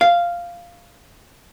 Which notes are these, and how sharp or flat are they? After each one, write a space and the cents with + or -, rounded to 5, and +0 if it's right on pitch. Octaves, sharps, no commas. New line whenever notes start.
F5 -5